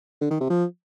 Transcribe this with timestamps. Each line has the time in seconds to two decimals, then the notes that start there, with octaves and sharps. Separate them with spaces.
0.21 D3
0.31 D#3
0.40 C3
0.50 F3